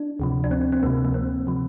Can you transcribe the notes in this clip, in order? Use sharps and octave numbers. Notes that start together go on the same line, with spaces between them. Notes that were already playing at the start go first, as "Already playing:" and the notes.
Already playing: D4
D2 C3 F3
D4
C4
C4
D2 C3 F3 A#3
A#3
C4
C3 F3